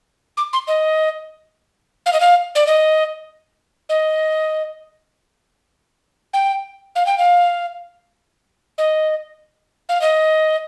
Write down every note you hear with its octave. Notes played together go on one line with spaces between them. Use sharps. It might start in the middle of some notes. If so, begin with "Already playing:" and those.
D6
C6
D#5
F5
D#5
F5
D5
D#5
D#5
G5
F5
G5
F5
D#5
F5
D#5